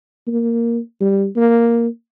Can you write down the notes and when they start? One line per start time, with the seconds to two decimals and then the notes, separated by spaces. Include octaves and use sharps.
0.27 A#3
1.01 G3
1.36 A#3